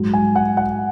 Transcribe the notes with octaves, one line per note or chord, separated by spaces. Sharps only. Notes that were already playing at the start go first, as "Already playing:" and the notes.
Already playing: G#2 F#3
G#5
F#5
F#5